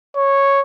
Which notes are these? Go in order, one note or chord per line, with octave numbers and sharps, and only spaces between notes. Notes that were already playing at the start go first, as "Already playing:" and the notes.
C#5